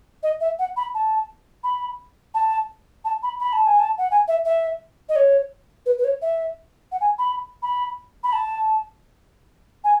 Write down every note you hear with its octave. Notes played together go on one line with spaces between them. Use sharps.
D#5
E5
F#5
B5
A5
B5
A5
A5
B5
B5
A5
G#5
A5
F#5
G#5
E5
E5
D#5
C#5
B4
B4
C#5
E5
F#5
G#5
B5
B5
B5
A5
G#5